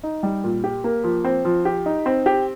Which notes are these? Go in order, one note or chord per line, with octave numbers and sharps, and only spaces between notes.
D#4
G3
A#2
G4
A#3
F3
C4
F3
G4
D#4
C4
G4